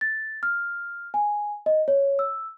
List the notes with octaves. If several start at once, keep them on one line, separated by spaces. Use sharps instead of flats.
A6
F6
G#5
D#5
C#5
E6